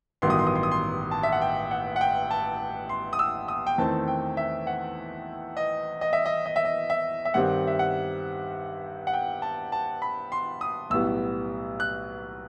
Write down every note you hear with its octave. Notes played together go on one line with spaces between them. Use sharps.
A1 G2 D#3 F#3 B3 C6
D#6
C6
D#6
C6
D#6
C6
A5
E5
F#5
G5
F#5
F#5
G5
A5
C6
D#6
E6
D#6
G5
E2 D#3 A3 C4 A5
G5
E5
F#5
D#5
D#5
E5
D#5
D#5
E5
D#5
E5
E5
G2 D#3 G3 C4 F#5
E5
F#5
F#5
G5
A5
A5
B5
C6
D#6
B1 A2 G3 B3 E6
F#6